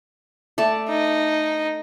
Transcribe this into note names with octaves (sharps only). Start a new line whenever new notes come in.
A3 D5 A5
D#4